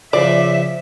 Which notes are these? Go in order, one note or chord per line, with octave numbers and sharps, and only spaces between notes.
C#3 F3 D5 E5